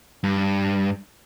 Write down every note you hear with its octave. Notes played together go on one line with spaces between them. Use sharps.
G2